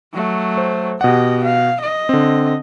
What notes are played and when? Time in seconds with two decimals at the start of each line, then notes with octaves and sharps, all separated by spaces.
0.14 F#3 A3
0.58 C5
1.01 B2 G4 D#5 F#5
1.44 F5
1.80 D#5
2.09 D3 C4